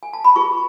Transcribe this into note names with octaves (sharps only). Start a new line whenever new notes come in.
G#5
A5
B5
F4 G#4 B4 C#6